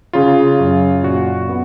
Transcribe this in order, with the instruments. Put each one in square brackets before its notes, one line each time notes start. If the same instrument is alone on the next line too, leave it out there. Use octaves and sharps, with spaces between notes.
[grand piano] C#3 [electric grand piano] F4
[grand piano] F#2
[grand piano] A#2 [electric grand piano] F#4
[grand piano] B3